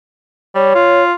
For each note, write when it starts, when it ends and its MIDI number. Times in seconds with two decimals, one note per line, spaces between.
0.55 0.73 55
0.55 1.03 73
0.75 1.14 65